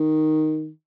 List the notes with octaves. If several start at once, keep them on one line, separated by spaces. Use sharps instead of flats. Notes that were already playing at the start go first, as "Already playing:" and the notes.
Already playing: D#3